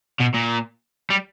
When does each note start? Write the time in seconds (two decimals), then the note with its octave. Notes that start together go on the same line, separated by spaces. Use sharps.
0.20 B2
0.35 A#2
1.11 G3